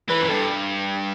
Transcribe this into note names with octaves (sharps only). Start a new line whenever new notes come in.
E3 B4
F#2
G2 A4